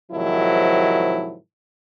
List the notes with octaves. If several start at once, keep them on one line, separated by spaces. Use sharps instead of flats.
G#2 C3 D#3 F3 F#3 E4